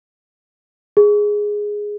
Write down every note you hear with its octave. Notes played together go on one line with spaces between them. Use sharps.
G#4